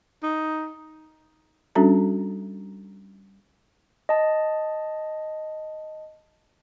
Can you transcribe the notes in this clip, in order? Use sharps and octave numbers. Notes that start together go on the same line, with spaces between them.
D#4
G3 C#4 D4 F#4 A4 A#5
D#5 A5